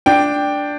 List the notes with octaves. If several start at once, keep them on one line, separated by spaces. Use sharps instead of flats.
D4 G5